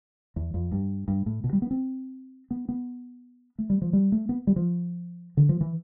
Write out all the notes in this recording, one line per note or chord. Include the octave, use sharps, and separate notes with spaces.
E2
F2
G2
G2
A2
B2
G3
B3
C4
B3
B3
A3
G3
F3
G3
A3
B3
G3
F3
D3
F3
E3